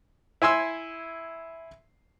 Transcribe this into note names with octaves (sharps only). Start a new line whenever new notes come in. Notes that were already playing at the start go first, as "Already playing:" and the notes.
E4 G#5 C6 E6